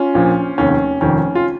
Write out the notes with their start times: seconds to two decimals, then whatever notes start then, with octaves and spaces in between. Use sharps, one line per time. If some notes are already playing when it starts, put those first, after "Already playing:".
Already playing: C#4 F4
0.14 A#1 A#2 F3
0.58 F1 D#2 D#3 C#4
1.01 F1 F2 D#3 C#4
1.35 F4